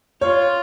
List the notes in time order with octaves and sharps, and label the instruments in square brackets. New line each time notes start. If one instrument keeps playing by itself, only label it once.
[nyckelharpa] F4 [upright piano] C#5